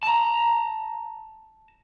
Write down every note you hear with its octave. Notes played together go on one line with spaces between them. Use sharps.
A5 A#5